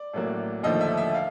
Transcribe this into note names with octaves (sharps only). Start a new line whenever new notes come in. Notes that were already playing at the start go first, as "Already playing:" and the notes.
Already playing: D5
A1 A2 F#3 A#3
D#2 D3 F3 A3 D#5
E5
E5
F5